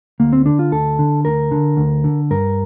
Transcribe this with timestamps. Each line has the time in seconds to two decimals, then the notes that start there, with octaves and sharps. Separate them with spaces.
0.20 D2 A#3
0.33 C4
0.46 D3 D4
0.59 F4
0.72 D2 A4
0.99 D3
1.25 D2 A#4
1.51 D3
1.77 D2
2.04 D3
2.31 G2 A#4